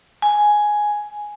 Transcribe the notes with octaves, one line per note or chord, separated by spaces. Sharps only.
G#5